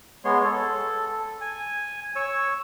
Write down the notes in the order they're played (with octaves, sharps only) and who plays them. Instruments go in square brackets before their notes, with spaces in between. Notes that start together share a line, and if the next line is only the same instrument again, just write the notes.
[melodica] G#3 B3 C#5 C6
A4
G#5
C#5 C#6 E6